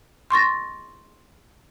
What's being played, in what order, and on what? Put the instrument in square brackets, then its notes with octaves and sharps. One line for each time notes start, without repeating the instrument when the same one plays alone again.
[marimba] C6 C#6 A6 A#6